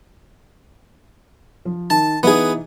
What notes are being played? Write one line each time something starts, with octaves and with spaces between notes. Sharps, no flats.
F3
D#3 A5
E3 B3 D#4 G#4